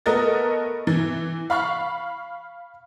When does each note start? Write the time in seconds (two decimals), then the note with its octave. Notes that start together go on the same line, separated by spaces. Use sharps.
0.06 A3 B3 A#4 D#5 A6
0.87 E3
1.50 F5 B5 C#6 F6